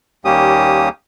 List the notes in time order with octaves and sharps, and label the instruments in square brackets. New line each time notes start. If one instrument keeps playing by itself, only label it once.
[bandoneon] D#2 G3 A#3 C#4 G4 D#6